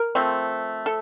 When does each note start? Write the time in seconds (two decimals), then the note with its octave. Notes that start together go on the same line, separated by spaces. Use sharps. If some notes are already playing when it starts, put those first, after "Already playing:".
Already playing: A#4
0.15 F3 A3 C4
0.86 A4